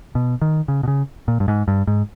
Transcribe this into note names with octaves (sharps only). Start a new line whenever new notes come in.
B2
D#3
C#3
B2
C#3
A#2
G2
G#2
G2
G#2